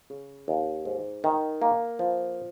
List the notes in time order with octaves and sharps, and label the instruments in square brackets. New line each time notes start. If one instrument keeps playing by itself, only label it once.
[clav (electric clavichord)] C#3
D#2
G#2
D#3
A#3
F3